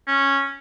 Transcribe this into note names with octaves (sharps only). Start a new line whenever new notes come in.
C#4